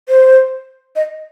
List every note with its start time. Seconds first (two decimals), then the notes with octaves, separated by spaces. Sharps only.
0.09 C5
0.96 D#5